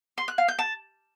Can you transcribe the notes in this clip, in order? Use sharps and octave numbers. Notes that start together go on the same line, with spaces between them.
C6
F#6
F5
G6
A5